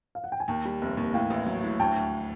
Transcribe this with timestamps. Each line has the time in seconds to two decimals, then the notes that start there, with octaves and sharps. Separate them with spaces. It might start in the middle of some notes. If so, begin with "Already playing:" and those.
0.15 F5
0.24 F#5
0.32 G5
0.40 G#5
0.48 D#2 G5 A5
0.65 G3
0.81 F1
0.97 D#2
1.14 A2 F5 G5
1.30 A1
1.46 F#3
1.63 A2
1.79 D2 G5 A5
1.96 D2